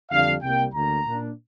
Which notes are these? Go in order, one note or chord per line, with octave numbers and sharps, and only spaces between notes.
F2 D3 G3 D4 F5
C2 C3 G3 A#3 G5
D2 D3 A#3 A#5
A#2 A#3 D4